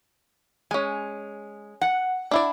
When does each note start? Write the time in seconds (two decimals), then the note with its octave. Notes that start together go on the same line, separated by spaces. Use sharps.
0.71 G#3 C#4 G#5
1.81 F#5
2.31 D4 E4 D5